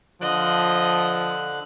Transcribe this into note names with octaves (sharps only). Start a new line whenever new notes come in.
D3 F3 D#5 F#6